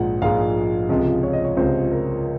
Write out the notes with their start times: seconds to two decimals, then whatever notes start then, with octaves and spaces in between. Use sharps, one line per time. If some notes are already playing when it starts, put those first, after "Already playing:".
Already playing: A#1 G#2 F3 G#3 F#5
0.22 A#1 G#2 F3 G#3 F5
0.89 C#2 C3 F3 G#3
1.23 C#5
1.33 D#5
1.44 C#5
1.57 C#2 C3 F3 G#3 C5
1.91 A#4